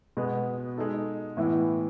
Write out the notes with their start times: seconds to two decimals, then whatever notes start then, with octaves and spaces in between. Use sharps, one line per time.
0.17 B2 G#3 B3
0.78 G#3 D#4 A4
1.37 A2 E3 B3 E4